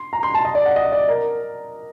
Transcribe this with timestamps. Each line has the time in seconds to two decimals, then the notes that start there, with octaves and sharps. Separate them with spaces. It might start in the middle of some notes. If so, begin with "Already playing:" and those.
Already playing: C6
0.13 A#5
0.23 C6
0.34 A5
0.45 D#5
0.55 D5
0.66 F#5
0.76 D#5
0.92 D5
1.09 A#4